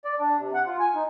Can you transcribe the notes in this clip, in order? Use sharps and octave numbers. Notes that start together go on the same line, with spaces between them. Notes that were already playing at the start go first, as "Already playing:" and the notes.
D5
D4
C3
F#5
F4
G#5
D#4